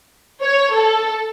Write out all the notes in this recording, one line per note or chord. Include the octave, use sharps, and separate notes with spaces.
C#5
A4